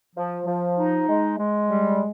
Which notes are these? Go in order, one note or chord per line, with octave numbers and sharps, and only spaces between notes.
F3
F3
D#4
G#3
G#3
G3